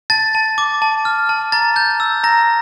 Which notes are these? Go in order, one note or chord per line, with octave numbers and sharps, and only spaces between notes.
A5 A6
A5
D6
A5
F6
A5
A#5 A6
G6
E6
A#5 A#6